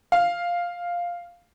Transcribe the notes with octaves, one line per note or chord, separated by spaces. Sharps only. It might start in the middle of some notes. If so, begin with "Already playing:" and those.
F5